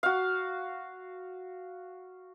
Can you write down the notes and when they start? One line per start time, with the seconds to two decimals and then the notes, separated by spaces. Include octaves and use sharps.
0.03 F#4 F5